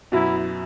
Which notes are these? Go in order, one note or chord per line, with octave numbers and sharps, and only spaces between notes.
F#2 B2 E4